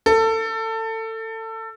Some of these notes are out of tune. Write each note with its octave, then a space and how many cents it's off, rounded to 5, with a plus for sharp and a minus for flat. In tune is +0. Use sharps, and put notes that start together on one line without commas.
A4 +25